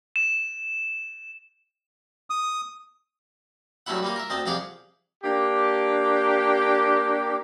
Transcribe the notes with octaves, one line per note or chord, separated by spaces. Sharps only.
E7
D#6
G2 F#3 A3 C#4 E4 F#5
G3 A#3 F4
A#4 E5
D2 C4 D#5 A5
C2 F2 G4 G#4 F5 F#5
A#3 D4 G4